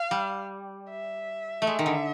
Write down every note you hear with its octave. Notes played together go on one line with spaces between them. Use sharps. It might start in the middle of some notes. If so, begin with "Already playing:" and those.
Already playing: F5
G3
E5
A3
G#3
D#3
D3